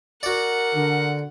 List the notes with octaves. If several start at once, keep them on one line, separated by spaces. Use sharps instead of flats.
F#4 A#4 D5 F#5
D3